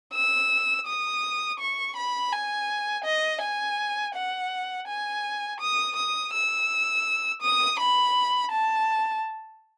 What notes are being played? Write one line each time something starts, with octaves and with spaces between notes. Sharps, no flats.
E6
D#6
C#6
B5
G#5
D#5
G#5
F#5
G#5
D#6
D#6
E6
D#6
B5
A5